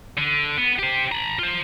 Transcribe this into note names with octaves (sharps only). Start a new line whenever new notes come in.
D3
B3
G4 C5
A#5 B5
F4 C5